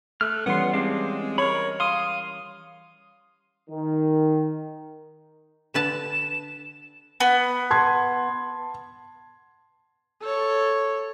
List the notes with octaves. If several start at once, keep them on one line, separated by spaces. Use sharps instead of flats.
A3 F6 F#6
E3 G3 B3 C#4 F#5 C6
G#3 C4 D4 F5
A#4 C#5 B5
F5 C6 D#6
D#3
D3 B4 A5 E7
B3
A5 C6 G#6
A4 C#5